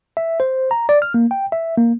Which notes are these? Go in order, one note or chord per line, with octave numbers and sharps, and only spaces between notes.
E5
C5
A#5
D5
F6
A#3
G5
E5
A#3